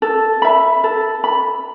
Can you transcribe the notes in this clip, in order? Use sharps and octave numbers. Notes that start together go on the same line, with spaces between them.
A4
E5 B5
A4
B5